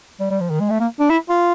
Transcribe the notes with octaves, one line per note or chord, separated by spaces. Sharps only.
G3
G3
F3
D#3
G#3
A3
A#3
D4
E4
F4